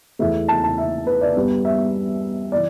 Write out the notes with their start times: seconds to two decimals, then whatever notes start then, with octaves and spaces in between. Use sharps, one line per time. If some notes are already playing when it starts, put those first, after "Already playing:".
0.19 E2 E3 A3 E5
0.48 A5
0.64 A5
0.78 E5
1.07 B4
1.21 D5
1.36 G2 G3 B3
1.65 E5
2.52 E3 D5